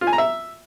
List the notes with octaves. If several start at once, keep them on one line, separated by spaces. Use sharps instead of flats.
F4
G#5
A#5
E5